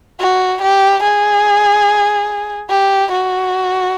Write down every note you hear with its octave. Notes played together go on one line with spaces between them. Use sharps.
F#4
G4
G#4
G4
F#4